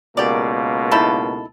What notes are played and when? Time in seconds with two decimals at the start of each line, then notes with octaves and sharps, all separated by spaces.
0.17 C#2 B2 A#3 G4 D5
0.91 D#4 E4 A4